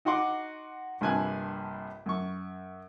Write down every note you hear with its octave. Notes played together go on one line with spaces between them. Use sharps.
D#4 F#4 F#5 C6 D6
A#1 G2 C3 G#5 A5 F#6
F#2 C#6